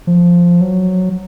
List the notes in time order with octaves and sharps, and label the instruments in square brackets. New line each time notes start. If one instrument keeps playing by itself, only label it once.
[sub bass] F3
F#3